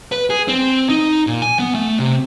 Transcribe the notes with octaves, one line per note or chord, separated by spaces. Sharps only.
B4
G#4
C4
D#4
A#2
G#5
B3
A3
C3